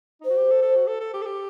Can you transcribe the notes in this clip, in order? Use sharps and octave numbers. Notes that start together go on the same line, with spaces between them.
D#4
C5
F#4
G4
A4
A4
F#4
A4
A4
G4
A4
G4